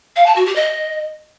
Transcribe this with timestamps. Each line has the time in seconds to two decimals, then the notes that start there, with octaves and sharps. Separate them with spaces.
0.16 F5
0.26 A5
0.36 F#4
0.46 G4
0.56 D#5